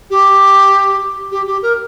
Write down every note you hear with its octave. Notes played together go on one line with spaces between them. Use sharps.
G4
G4
G4
A#4